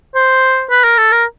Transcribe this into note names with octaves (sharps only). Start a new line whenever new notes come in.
C5
B4
A#4
A4
A#4